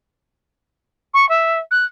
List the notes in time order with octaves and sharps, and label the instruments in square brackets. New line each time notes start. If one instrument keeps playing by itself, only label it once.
[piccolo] C#6
E5
F#6